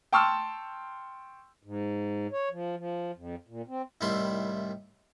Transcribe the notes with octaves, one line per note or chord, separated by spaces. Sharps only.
G5 A5 C6 C#6 E6 F6
G#2
C#5
F3
F3
F2
A#2
C4
C2 A2 D#3 G3 E4 C6